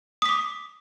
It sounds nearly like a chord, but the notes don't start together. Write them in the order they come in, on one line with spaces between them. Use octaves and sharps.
D#6 B6 D6